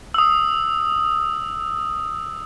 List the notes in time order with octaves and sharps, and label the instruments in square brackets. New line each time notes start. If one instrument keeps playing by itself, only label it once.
[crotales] D#6 E6